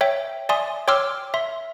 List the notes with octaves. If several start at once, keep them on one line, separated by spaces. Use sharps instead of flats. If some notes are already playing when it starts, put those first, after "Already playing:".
C#5 E5 G5
D5 E5 G#5 C6 D#6
C#5 G5 C6 D6 E6 F6
E5 C6